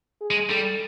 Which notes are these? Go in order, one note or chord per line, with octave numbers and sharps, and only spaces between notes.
G#4
G#3
G3 A4